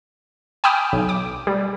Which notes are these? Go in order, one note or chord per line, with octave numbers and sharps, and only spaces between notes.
G5 G#5 B5 D6 D#6 F6
B1
D6
G3